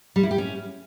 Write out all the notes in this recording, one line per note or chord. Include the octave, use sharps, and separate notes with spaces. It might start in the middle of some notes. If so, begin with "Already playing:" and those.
G3
E4
G4
C#4